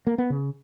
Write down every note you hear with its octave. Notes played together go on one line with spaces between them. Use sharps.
A#3
B3
C#3